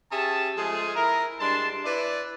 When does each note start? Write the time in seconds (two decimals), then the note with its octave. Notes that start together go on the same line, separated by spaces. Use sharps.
0.11 C#4 G4 G#4 E5 A5
0.58 F3 G#3 A3 G#4
0.95 E4 A#4
1.40 G2 G3 G#3 D4 A5 C6
1.85 E4 B4 D5